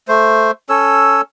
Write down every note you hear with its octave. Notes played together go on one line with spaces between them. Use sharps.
A3 C5
C#4 A4 C#5 E6